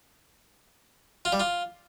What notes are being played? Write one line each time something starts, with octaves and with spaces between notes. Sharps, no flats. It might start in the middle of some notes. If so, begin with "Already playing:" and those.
F4
G3
F4